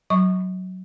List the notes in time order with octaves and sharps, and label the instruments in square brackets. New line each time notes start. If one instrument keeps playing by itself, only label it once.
[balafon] F#3 C#6